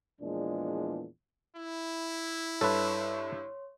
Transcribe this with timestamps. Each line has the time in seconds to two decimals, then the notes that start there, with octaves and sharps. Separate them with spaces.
0.21 E2 A#2 F3 G#3 D4
1.57 E4
2.61 G2 A4 B4 C#5 E5 C6